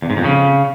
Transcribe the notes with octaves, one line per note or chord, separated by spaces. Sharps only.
E2
G#2
F2
C#3